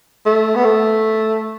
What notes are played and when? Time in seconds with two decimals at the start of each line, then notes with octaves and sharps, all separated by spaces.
0.26 A3
0.55 B3
0.64 A3